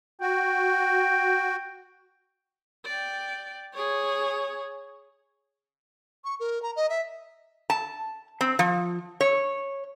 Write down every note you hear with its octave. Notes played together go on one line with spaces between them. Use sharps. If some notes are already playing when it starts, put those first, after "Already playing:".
F#4 G5
D5 G5
G#4 C#5
C#6
A#4
A#5
D#5
E5
A5
C4
F3
C#5